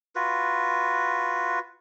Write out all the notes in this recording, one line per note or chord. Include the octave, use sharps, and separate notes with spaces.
F4 F#4 B4